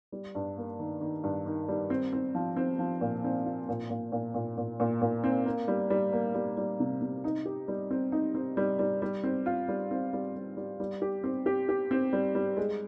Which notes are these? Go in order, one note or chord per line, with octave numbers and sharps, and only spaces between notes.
G3
G2
A#3
D#3
D#3
G2
D#3
G3
C4
C4
F3
C4
F3
A#2
C4
F4
A#2
A#2
A#2
A#2
A#2
A#2
A#2
C4
A#3
G3
G3
A#3
G3
G3
C3
C3
D#4
G4
G3
C4
D#4
C4
G3
G3
G3
C4
F4
G3
C4
G3
G3
G3
G3
G4
C4
G4
G4
C4
G3
G3
G#3